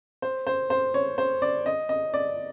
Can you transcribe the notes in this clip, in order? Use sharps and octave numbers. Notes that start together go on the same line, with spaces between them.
C5
C5
C5
C#5
C5
D5
D#5
D#5
D5